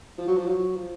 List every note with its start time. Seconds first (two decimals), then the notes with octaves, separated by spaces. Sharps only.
0.18 F3
0.27 F#3
0.37 F3
0.48 F#3
0.76 F3